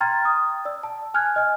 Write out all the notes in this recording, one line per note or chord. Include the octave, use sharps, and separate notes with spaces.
G5 A#5 C6 F6 G#6 A6
D#6
D5 E6
A5
G#5 F6 F#6 G#6
D#5 G#5